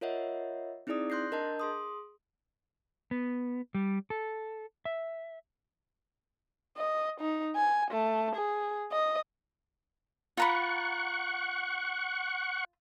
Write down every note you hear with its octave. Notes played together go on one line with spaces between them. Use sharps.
F4 A#4 C#5 D#5 E5 F#5
C4 D#4 E4 G#4 D5 D#6
C6 F#6 G6 A#6 C7
D4 A#4 D#5 A5 G6
G#4 C6 D#6
B3
G3
A4
E5
D#5
D#4
G#5
A3
G#4
D#5
F4 F#5 A#5 B5 C#6